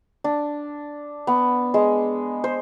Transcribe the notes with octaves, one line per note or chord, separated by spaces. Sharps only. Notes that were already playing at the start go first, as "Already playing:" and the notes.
D4
B3
G#3
C5